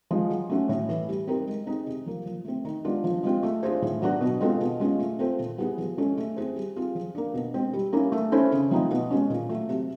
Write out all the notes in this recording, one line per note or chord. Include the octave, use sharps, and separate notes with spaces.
F3 G#3
F#3
A3 C#4 F#4
A2
E3 A3
G3
C4 D#4 G4 A#4
G#3
C4 D#4 G#4
C3
F3 A#3
F3
A3 C4
D#3
G#3 B3 D4 F4
F3
G#3 C4 F4
A3
D4 F4 G#4 C5
A2
F#3 B3 D4 F#4
B2
G#3 C4 F4 A4
B2
G#3 C#4 F4 G#4
A3
C4 F4 A4 C5
A#2
G3 B3 E4 G#4
F3
G#3 C#4 E4 A4
A3
C4 E4 G#4 C5
G3
C4 F4 G#4
F3
A#3 D4
B2
G#3 C4
G3
A#3 C#4 E4
A3
C#4 E4 A4 C5
C#3
F3 A3 C4 D#4
B2
G#3 C#4
A#2
F#3 A3
C3